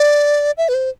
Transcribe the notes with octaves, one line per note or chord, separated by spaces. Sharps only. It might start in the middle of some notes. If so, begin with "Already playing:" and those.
Already playing: D5
E5
B4
C5